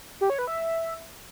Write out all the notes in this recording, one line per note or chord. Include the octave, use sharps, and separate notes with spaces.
G4
C#5
B4
E5